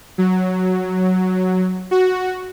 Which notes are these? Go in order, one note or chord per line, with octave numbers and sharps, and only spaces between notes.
F#3
F#4